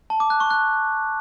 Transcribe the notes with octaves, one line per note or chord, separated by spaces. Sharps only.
A5
D6
F#6
C#6
F#6